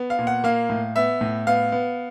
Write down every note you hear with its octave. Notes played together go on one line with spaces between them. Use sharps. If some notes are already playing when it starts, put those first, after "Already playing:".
Already playing: B3
F5
A#2
F#5
A#3 F5
A2
B3 E5
A2
B3 F5
B3